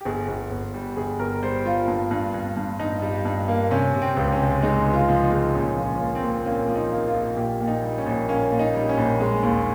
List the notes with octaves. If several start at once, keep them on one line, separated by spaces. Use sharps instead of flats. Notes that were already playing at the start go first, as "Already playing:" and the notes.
G4
G1 G#4
G1
G1
G3
G1 G#4
G1 A#4
G3 C5
G3 F4
G2
G2
G2
G2
G2 D#4
G3
G2
A#3
C3 C#4
C3
C4
C#2
C#4
C3
G#3 D#4
C#2
F4
F3
D#4
G#3
A#1 C#4
F3
C#4
A#3
C4
A#2
A#3 C#4
F3
D#4
A#3
F4
A#1
A#2 G4
A#2
D#4
G3
C#4
A#1
A#3 C#4
A#2
D#4
G3
C#4
A#1
G#3
D#2